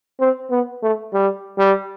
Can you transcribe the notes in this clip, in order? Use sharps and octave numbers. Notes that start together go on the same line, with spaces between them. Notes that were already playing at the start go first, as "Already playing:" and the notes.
C4
B3
A3
G3
G3